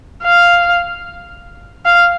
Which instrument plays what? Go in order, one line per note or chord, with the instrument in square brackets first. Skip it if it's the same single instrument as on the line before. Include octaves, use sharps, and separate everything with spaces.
[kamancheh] F5
F5